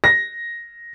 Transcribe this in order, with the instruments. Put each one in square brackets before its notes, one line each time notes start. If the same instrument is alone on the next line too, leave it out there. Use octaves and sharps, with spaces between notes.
[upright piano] A#6